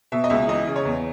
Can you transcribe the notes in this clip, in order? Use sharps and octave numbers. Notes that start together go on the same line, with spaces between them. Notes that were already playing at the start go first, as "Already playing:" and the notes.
B2 E5
D#5
C#2 E5
E3 D#5
C#3
C#5
E2